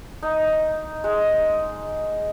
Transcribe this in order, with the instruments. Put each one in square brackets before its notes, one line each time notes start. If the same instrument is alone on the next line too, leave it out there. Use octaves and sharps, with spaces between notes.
[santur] D#4
G#3